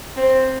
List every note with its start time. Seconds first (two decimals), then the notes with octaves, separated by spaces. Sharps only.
0.17 C4